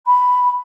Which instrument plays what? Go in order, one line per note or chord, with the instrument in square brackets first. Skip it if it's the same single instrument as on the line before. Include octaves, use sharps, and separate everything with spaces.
[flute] B5